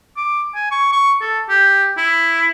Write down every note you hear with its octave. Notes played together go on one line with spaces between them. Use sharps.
D6
G#5
C#6
C#6
A4
G4
E4